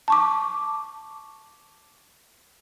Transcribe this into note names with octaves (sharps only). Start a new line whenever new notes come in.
A5 C#6 D6